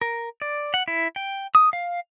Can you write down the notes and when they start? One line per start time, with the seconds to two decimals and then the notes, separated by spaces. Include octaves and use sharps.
0.01 A#4
0.42 D5
0.74 F#5
0.88 E4
1.16 G5
1.55 D#6
1.73 F5